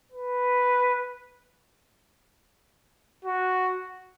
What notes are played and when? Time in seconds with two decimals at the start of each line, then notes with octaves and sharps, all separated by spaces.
0.12 B4
3.25 F#4